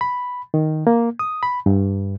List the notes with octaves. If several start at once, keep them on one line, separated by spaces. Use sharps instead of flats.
B5
D#3
A#3
D#6
B5
G2